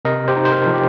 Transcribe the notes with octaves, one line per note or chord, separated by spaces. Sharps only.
C3 A#4 D#5
G4 C5
D#4
C5
A#4
F3
G4